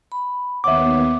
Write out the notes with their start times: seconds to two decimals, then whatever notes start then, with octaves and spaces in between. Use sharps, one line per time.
0.12 B5
0.64 D#2 B3 C#5 E5 F#5 D6